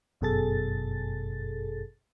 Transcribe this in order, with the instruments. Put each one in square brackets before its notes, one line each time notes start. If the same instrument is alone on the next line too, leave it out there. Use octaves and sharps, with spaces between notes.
[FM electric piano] G1 F#2 B2 G#4 A4 A6